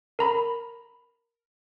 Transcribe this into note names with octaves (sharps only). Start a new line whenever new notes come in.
A#4 A#5 B5